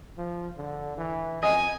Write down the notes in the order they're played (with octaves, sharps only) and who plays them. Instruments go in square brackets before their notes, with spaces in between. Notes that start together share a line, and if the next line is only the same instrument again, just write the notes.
[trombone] F3
D3
E3
[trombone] F2 [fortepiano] D#5 [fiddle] G#5